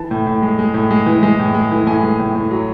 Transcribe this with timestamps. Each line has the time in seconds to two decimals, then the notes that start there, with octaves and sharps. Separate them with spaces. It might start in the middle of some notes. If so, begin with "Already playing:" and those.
Already playing: E3 A5
0.11 A2
0.27 A2
0.42 G#3
0.59 G#3
0.74 A2
0.91 G#3
1.06 E3
1.23 G#3
1.39 A2
1.55 G#3
1.71 E3
1.86 A2 G#5
2.03 G#3
2.19 A2
2.35 A2
2.51 F#3